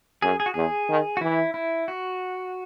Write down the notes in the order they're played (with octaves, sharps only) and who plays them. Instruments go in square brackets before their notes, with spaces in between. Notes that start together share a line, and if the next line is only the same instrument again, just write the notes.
[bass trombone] F#2 [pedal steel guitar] G#4
[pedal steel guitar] G#4
F#4
[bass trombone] E2 [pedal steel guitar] G#4
[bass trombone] D#3
[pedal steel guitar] F#4
[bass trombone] E3 [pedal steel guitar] E4
[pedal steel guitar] E4
F#4